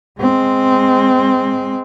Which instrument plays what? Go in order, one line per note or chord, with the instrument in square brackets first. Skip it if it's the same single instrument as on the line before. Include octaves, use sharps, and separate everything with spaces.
[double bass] G#3 C4